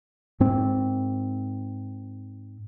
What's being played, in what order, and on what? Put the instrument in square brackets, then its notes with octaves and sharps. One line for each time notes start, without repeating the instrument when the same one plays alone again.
[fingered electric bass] G#2 C4